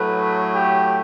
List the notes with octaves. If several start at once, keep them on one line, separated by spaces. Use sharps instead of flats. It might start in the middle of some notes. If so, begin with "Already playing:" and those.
Already playing: A2 F#3 A3 B4
G4